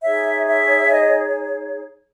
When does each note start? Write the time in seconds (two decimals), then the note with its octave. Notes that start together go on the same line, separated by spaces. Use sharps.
0.02 D#4 G#4 C#5 E5
0.47 E5
0.91 D#5